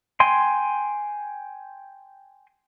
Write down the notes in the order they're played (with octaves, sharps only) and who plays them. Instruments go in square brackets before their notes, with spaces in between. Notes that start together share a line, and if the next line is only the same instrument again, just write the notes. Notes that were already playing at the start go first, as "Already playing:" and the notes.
[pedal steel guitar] G5 G#5 C6